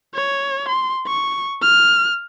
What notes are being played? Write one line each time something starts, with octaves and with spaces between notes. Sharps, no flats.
C#5
C6
C#6
F6